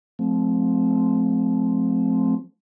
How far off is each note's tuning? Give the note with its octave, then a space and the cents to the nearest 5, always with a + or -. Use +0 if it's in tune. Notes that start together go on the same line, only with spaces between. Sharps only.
F3 +25 A3 -30 C4 +0